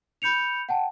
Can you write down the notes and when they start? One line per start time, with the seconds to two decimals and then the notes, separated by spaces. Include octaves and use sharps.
0.22 B5 G6 C#7 F7
0.69 F#5 G5 A5